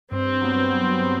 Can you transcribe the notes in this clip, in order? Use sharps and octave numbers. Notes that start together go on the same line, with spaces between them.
G2 C4
F#3 B3
G2
F#3 B3